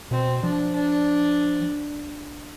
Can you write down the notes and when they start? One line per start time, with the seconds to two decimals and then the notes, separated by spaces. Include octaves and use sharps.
0.11 B2 C4
0.43 F3 D4
0.76 D4